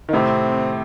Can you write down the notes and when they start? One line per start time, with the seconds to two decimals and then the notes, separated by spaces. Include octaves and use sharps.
0.09 D#3
0.13 A2 C3 C4